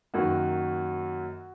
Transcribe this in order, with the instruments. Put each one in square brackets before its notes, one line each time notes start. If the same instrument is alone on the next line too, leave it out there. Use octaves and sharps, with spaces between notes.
[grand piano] F#2 D#3 F#3 A#3 F#4